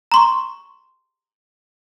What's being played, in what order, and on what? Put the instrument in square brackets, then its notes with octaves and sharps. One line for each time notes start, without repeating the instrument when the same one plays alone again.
[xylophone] A#5 C6 C#6